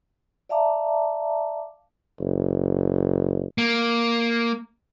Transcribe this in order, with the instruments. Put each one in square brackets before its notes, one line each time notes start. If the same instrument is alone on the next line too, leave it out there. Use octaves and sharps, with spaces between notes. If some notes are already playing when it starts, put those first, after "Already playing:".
[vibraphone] D5 E5 F5 A5 A#5 D6
[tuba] F#1
[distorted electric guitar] A#3